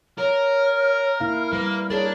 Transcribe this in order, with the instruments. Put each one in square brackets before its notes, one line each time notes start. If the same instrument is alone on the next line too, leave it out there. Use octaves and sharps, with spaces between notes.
[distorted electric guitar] A#4 [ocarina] C#5 [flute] F6
[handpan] A#3 E4 F5
[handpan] G3 [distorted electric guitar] A#3 [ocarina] B4
[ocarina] G#4 [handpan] A#4 [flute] C#5 [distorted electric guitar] D5 A5